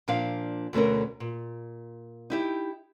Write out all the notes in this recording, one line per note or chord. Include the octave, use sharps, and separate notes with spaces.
A#2 F3 D4 F5
D2 B2 A3 C#4 A#4
A#2
D#4 E4 G4